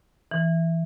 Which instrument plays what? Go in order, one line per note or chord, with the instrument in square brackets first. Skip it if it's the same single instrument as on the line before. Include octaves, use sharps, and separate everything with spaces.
[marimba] E3